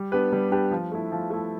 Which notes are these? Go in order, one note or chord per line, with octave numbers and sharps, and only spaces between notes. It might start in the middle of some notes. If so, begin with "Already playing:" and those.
Already playing: G3
B3 D4 G4 B4
G3
B3 D4 G4 B4
F3
A3 E4
F3
A3 E4